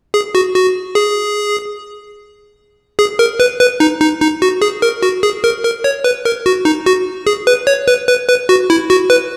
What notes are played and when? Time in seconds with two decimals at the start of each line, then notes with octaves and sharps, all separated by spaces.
0.14 G#4
0.35 F#4
0.55 F#4
0.95 G#4
2.99 G#4
3.19 A#4
3.40 B4
3.60 B4
3.80 D#4
4.01 D#4
4.21 D#4
4.42 F#4
4.62 G#4
4.82 A#4
5.03 F#4
5.23 G#4
5.44 A#4
5.64 A#4
5.84 C#5
6.04 B4
6.25 A#4
6.46 F#4
6.65 D#4
6.86 F#4
7.27 G#4
7.47 B4
7.67 C#5
7.88 B4
8.08 B4
8.28 B4
8.49 F#4
8.70 E4
8.90 F#4
9.10 B4